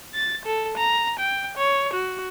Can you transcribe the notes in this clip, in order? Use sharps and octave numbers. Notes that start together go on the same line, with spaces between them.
A6
A4
A#5
G5
C#5
F#4